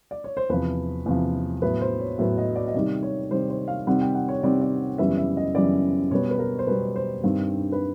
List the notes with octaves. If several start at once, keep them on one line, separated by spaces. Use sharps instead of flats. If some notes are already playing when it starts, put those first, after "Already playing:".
D5
C#5
C5
E2 C3 F3 B4
E2 C3 F3
A2 F#3 B3 B4
C5
C#5
A2 F#3 B3
D#5
D5
D#5
C3 D#3 G3 D5
C#5
C3 D#3 G3 C5
C5
F5
C3 D#3 G3 C4 F#5
G5
F#5
C#5
C3 D#3 G3 C4 D5
D5
F#2 C#3 E3 G3 B3 E5
E5
D#5
F#2 C#3 E3 G3 B3 D5
B2 G3 B3 C#5
B4
A#4
C5
B2 G3 B3 B4
C5
G2 D#3 G3 C4
B4